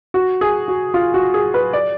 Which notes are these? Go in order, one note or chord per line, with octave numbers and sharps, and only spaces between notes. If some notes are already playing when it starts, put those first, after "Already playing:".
F#4
G#4
F#4
F4
F#4
G#4
B4
D5